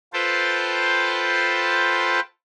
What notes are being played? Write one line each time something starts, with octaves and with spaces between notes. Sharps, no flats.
F4 A4 B4 C5 G5 A5